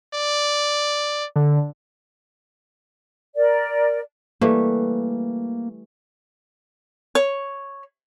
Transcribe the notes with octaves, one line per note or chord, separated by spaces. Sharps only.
D5
D3
A#4 D5
E3 G3 A3 A#3
C#5